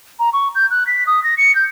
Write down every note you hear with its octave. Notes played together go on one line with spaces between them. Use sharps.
A#5
C#6
G6
F#6
B6
D#6
A#6
C#7
G6